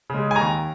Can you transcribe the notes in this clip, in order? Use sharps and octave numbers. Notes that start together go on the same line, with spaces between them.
C#3 G#3
G#5
D#2 A#5